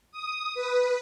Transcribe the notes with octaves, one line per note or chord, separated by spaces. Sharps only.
D#6
B4